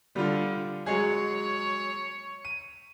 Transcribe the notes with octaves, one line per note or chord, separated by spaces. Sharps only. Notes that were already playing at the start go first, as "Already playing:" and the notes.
D3 G3 F4
F#3 G#3 G#4 C#5
D#7